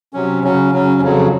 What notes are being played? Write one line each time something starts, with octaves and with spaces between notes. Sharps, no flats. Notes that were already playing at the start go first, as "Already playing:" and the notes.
C3 F#3 C#4
C#3 F#3 C#4
C#3 F#3 C#4
F2 C#3 F#3